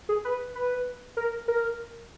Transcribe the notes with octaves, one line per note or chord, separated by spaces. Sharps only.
G#4
B4
B4
A#4
A#4